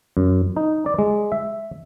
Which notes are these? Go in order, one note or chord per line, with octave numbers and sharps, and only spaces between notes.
F#2
D#4
D5
G#3
E5